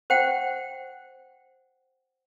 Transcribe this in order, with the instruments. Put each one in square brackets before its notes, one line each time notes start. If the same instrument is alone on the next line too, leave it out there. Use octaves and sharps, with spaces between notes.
[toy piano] C5 F#5 G5